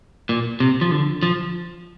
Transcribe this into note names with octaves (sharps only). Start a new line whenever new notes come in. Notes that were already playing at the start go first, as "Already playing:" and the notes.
A#2
C3
F3
D3
F3